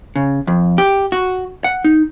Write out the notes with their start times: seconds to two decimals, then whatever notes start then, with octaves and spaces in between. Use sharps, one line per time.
0.16 C#3
0.47 F2
0.78 G4
1.12 F#4
1.64 F#5
1.84 D#4